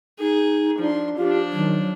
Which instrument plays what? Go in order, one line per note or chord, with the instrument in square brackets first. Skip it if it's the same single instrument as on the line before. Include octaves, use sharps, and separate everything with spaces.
[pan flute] D#4 [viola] G#4
[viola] F3 C6 [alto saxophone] D4
[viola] F3 D4 [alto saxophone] F4 [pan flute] G4
[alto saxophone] D#3 [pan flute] F#3